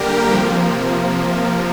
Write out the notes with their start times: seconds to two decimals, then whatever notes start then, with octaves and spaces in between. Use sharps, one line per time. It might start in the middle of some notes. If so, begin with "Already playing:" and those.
Already playing: D3 G3 A#3 G4 A#4
0.31 C3 F3 A#3